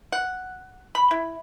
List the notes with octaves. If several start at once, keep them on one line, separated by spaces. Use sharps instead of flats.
F#5
B5
E4